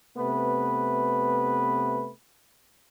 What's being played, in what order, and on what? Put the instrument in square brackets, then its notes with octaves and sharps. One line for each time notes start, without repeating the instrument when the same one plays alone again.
[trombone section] C3 A3 B3 B4